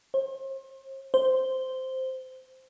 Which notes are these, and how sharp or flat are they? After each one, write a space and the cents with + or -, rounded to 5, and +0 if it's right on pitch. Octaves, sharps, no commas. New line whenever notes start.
C5 +40
C5 -5